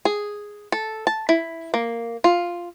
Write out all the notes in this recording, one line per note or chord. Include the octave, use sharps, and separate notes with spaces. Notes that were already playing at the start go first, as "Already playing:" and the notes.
G#4
A4
A5
E4
A#3
F4